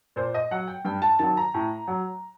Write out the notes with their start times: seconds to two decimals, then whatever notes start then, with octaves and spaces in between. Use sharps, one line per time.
0.16 A#2 C5
0.34 D#5
0.51 F#3 F#5
0.68 G5
0.85 G2 G5
1.02 A5
1.19 D#3 F#3 A5
1.37 A#5
1.54 A2
1.87 F#3